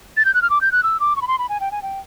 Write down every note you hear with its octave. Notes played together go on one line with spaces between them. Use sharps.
A6
G6
F#6
F6
D6
G6
F#6
E6
D6
C#6
B5
C6
B5
G#5
G5
G#5
G5